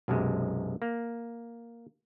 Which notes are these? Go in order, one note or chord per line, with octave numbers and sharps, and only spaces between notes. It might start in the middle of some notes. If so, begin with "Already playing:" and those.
B1 F#2 C3 G#3
A#3